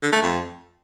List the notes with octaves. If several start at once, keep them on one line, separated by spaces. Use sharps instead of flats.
D3
A3
F2